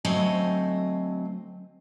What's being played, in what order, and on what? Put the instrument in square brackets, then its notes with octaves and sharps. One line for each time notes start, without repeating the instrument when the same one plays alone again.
[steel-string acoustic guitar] D2 F#3 A3 C4 D#5 G#5